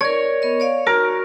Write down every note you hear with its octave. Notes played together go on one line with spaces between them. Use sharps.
A#4 C#5 D5
B3 A#4 D#5
C#5 D5 F5
F#4 A#4